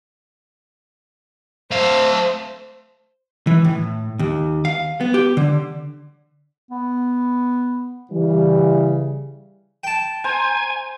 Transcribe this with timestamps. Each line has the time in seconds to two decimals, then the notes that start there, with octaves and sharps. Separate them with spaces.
1.71 A3 C5 F5
3.47 E3
3.65 A2
4.19 D#2
4.65 F5
5.01 B3
5.14 G4
5.37 D3
6.71 B3
8.11 C#3 E3 G3
9.84 G5 A5
10.24 C5 G#5 A#5